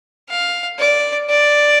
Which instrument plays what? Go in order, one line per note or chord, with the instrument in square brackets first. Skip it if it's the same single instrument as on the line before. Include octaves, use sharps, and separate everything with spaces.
[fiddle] F5
D5
D5